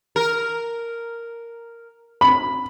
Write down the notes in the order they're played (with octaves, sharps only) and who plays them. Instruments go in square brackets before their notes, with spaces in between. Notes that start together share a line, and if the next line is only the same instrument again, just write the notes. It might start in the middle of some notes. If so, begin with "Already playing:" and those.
[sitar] A#4
[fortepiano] B5